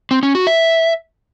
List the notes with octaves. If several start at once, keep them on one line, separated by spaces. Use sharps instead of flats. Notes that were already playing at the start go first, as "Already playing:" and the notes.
C4
C#4
F#4
E5